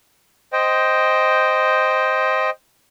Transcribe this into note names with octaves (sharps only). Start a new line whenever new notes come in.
C5 D#5 G5